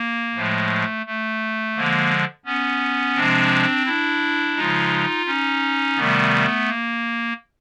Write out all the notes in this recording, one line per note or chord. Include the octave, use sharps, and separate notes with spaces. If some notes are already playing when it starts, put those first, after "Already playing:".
Already playing: A#3
A2 F3 G#3 A3
A3
D3 F3 G#3 A#3
B3 C#4
C3 F3 G#3 C4 D4
D4 E4
C#3 F3 G#3 D#4 F4
C#4 D#4
C3 D#3 G3 A3 B3
A#3